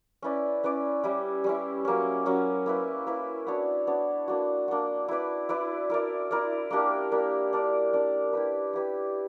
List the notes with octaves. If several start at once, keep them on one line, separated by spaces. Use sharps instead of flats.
C#4 E4 B4 D5
C#4 E4 B4 D5
G3 C#4 E4
G3 C#4 E4
F#3 A#3 C#4
F#3 A#3 C#4
A#3 E4 B4
A#3 E4 B4
B3 D4 F#4 C#5
B3 D4 F#4 C#5
A#3 D4 F#4
A#3 D4 F#4
E4 B4 D5
E4 B4 D5
E4 A#4 D5
E4 A#4 D5
A#3 D4 G4 A#4
A#3 D4 G4 A#4
D4 A#4 D5
D4 A#4 D5
E4 G4 B4
E4 G4 B4